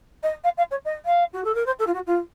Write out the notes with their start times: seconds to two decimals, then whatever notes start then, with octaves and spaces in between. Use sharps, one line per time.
0.23 D#5
0.44 F5
0.57 F5
0.71 C#5
0.85 D#5
1.05 F5
1.33 F#4
1.44 A4
1.54 A#4
1.66 C5
1.79 A4
1.87 F4
1.94 F#4
2.06 F4